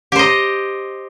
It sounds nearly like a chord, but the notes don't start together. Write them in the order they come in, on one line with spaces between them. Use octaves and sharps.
G4 C5 D#5